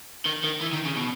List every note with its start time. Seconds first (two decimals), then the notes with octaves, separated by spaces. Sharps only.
0.26 D#3
0.44 D#3
0.61 E3
0.73 D#3
0.85 C#3
0.97 B2